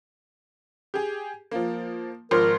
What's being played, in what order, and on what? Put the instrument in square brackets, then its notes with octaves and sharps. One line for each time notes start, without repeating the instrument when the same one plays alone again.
[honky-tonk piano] G4 G#4
F3 A#3
[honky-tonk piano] G#1 F3 C6 [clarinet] A#4